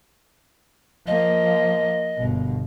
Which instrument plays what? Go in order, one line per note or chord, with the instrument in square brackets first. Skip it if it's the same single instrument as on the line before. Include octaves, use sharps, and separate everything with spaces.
[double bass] F3 A#3 [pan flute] D#5
[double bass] G1 B2